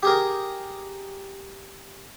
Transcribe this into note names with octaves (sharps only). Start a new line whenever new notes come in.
G4 G#4 A#4